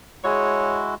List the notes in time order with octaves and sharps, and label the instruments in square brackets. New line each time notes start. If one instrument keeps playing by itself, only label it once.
[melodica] G#3 E4 F#4 [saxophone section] G#4 C#5